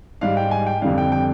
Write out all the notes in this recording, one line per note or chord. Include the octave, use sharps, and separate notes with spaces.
G#2 G3 F5
G5
G#5
G5
F2 D3 G3 F5
G5
G5